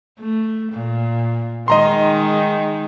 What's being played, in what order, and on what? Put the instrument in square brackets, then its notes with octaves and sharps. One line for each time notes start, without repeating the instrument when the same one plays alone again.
[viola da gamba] A3
A#2
[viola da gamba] D#3 G#3 D#4 [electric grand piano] D#5 A#5 C6